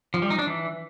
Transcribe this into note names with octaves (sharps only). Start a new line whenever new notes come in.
F3
G3
D#4
D4
E3